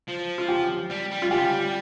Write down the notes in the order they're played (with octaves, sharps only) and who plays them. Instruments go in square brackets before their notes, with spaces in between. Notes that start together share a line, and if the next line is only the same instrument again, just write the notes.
[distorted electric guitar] F3
[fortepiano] F4
G4
[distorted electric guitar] G3
G3
[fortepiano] F4
[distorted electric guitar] G3 [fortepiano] G4